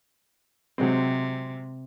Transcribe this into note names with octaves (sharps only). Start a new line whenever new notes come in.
C3 F#3 G#3 C4